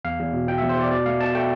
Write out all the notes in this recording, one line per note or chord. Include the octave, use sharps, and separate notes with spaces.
E2 F5
E2
B2
B2 G5
E2 E5
C5
E2 D5
B2 D5
A3 F5
B2 A5
A3 G5